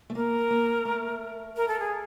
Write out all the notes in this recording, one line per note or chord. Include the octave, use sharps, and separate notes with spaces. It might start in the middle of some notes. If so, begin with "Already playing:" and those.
A3
A#3 A#4
A#3
A3
A#4
A4
G#4